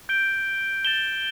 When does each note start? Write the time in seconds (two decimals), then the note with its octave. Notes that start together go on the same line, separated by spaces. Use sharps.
0.09 G6 D7 G7
0.85 A6 E7 G7